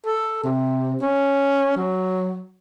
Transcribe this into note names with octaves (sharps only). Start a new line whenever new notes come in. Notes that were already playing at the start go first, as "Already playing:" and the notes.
A4
C3
C#4
F#3